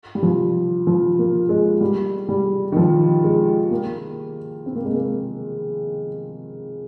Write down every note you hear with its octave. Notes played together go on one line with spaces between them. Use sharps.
G3
F3
F3
A#3
G#3
G3
G3
D#3
F3
G#3
A#3
C4
A#3
G#3
A#3